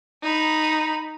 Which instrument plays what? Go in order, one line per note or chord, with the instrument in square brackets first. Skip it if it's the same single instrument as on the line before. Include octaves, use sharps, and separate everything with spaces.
[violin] D#4 B5